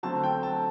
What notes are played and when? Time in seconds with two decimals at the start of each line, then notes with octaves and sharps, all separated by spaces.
0.03 D3 F#3 A3 C4 A5
0.23 G5
0.43 A5